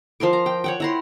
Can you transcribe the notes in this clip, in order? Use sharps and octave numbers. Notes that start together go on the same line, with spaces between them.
F3 A#4 C6 D6
A#5
G5
C#5 F#5 G5
E4 A#5 C6